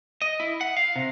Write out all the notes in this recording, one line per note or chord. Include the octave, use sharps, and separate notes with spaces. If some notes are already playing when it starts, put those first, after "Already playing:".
D#5
E4
F#5
F5
C3